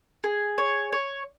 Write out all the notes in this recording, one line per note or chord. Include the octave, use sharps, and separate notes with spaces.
G#4
C#5
C#5